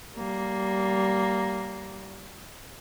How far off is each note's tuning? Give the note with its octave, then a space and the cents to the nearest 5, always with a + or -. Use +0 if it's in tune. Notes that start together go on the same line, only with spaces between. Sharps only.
G3 -25 A#3 +0